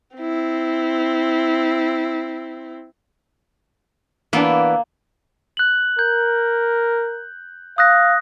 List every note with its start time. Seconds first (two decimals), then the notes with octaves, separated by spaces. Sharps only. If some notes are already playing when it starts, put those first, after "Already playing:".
0.17 C4 E4
4.33 E3 A#3 B3 D4
5.57 F#6 F#7
5.99 A#4 G6
7.78 F5 D#6 F#6 A#6